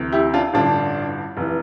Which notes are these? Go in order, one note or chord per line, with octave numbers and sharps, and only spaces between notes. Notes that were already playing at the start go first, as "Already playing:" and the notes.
Already playing: D2 C3 E3
E4 G4
D4 F4
A1 G2 D3 D4 F4
F1 E3